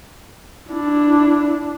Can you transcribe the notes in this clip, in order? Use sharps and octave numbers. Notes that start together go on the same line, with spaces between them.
D4 E4